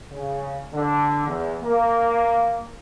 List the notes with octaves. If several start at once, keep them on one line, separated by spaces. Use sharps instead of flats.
C#3
D3
E2
A#3